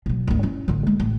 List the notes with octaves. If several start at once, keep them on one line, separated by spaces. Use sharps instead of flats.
B2 F#3
G#1 D2
C#4 E4
A1 D3
G#3
A1